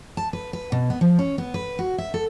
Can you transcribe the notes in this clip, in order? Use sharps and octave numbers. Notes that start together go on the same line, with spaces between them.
A5
B4
B4
B2
B3
F3
C#4
B3
B4
F#4
E5
A4